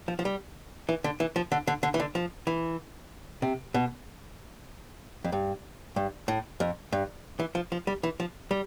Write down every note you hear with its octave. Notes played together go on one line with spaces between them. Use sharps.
F3
F3
G3
E3
D3
E3
F3
D3
D3
D3
E3
D3
F3
E3
C3
B2
F2
G2
G2
A2
F2
G2
E3
F3
F3
G3
E3
F3
G3